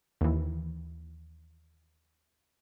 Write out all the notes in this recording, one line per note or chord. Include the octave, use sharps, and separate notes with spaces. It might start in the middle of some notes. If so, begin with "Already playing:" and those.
D#2 E3